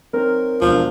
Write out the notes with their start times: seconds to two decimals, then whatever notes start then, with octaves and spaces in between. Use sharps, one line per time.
0.13 F#3 C4 D#4 A#4
0.61 E1 F3 D4